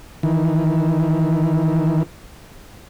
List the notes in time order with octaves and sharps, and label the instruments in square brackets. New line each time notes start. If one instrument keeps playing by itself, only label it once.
[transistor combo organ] D#3 E3